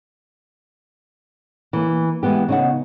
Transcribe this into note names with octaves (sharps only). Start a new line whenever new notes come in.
E3 A#3
E3 G#3 B3 G4
C#3 D#4 F#5